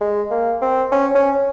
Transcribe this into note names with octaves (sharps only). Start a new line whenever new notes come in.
G#3
A#3
C4
C#4
C#4